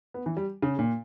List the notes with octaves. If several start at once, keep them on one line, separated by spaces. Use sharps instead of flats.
B3
E3
G3
C#3
A#2